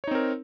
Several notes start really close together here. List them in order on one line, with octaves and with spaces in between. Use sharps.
C#5 D#4 C4 A#4